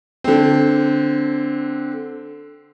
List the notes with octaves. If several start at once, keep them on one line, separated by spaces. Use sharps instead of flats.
D3 C4